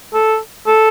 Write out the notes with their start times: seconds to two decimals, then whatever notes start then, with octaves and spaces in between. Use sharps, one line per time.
0.14 A4
0.67 A4